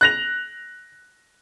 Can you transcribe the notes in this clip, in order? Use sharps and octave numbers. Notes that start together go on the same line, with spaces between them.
F#6 A#6 F7